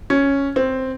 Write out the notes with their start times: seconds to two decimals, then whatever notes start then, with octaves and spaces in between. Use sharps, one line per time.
0.10 C#4
0.56 C4